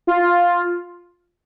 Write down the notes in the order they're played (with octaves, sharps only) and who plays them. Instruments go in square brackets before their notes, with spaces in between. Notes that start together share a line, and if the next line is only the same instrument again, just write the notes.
[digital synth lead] F4